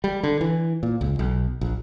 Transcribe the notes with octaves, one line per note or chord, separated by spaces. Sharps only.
G3
D3
E3
A#2
C#2
B1
A#1